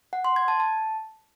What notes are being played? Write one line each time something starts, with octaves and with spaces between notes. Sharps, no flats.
F#5
C6
G#6
A5
A5